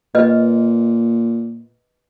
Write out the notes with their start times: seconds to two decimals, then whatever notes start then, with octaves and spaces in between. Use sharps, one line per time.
0.15 A#2 B4 D#5